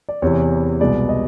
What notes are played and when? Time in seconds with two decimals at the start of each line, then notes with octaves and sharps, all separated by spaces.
0.09 D5
0.22 E2 C3 E3 C#5
0.80 C2 B2 G#3 B3 D5
1.09 D#5